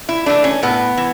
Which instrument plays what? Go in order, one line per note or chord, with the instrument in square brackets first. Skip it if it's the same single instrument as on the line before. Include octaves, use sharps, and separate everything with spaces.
[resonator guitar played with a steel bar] E4
E3 A3 D4
C#4
A2 B3
E3